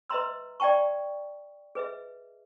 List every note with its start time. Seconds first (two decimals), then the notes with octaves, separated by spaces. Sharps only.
0.10 B4 D#5 E5 A#5 C6 E6
0.60 D5 E5 G5 A5 C#6
1.75 G#4 B4 D#5 E5